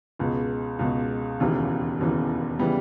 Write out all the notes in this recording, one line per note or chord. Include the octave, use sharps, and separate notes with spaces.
C#2 B2 G#3
C#2 B2 G#3
E1 D#2 C#3 E3
E1 D#2 C#3 E3
C#3 E3 G3 B3